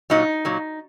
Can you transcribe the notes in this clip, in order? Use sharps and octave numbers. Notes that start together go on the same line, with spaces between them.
A#2 F#3 D#4
A#2 F#3